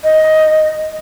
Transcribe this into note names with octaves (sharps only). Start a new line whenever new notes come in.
D#5